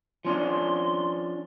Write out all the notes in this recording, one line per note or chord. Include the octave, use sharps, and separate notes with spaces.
F3 C#4 D4 C6